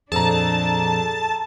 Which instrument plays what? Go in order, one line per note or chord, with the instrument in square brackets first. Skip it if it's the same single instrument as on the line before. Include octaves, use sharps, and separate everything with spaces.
[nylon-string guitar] F2 A#2 [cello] D4 [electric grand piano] G#4 A4 A#5 [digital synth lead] A5